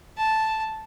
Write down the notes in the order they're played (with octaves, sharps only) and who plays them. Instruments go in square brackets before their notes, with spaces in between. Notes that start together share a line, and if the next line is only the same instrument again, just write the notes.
[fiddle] A5